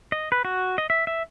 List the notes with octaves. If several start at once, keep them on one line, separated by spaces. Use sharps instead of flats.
D#5
B4
F#4
D#5
E5
E5